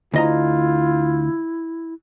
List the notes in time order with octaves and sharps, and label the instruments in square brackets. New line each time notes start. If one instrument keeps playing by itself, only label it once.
[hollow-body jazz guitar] D2 D#5 A#5 [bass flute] E4 [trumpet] F4